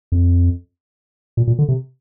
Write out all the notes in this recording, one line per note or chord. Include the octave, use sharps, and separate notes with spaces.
F2
A#2
A#2
D3
C3